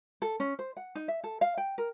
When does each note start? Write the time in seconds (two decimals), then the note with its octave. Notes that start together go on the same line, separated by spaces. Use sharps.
0.22 A4
0.40 C#4
0.59 C5
0.77 F#5
0.95 D#4
1.08 E5
1.24 A4
1.41 F5
1.57 G5
1.78 A#4